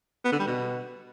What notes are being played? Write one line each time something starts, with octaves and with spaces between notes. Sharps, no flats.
B3
D3
G3
B2